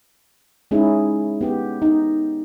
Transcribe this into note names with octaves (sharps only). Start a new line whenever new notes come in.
G#3 C#4 D#4 E4 G#4
B3 G4
D#4